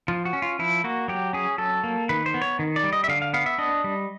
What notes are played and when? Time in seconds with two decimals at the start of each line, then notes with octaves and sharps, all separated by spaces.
0.08 F3 F4
0.25 F#4
0.33 C#4
0.42 F4
0.59 F3 E4
0.84 A#3 F#4
1.08 F#3 G4
1.33 C#4 G#4
1.58 F#3 A4
1.84 A#3
2.09 D#3 B4
2.26 C5
2.34 B3
2.42 C#5
2.59 D#3
2.76 D5
2.83 G3
2.93 D#5
3.04 E5
3.08 D3 F5
3.22 F5
3.33 B3 F5
3.46 E5
3.58 D4 D#5
3.84 G3